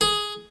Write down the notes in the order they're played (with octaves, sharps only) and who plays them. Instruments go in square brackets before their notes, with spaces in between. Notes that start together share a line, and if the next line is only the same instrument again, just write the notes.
[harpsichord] G#4